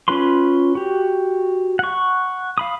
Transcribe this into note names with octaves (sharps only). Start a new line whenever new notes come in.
C#4 F4 B4 B5 C6
F#4 G4
F#5 C#6
F5 B5 D#6